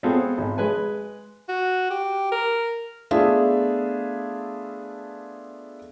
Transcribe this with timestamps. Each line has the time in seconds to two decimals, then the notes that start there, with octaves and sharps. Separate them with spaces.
0.03 G#3 B3 C4 F4 G#4 A4
0.38 G#1
0.58 G#3 B4 G#5
1.49 F#4
1.91 G4
2.32 A#4
3.11 A3 B3 D4 F4 G#4 E5